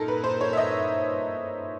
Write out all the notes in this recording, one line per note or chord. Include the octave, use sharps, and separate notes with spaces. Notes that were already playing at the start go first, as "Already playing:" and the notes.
Already playing: A#2 D#4 A4 A#4
B4
C5
C#5
E5
D#5